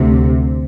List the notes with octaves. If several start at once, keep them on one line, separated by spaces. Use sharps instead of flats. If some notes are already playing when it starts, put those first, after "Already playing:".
Already playing: D2 C3